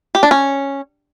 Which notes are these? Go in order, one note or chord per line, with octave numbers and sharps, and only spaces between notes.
G4
D4
C#4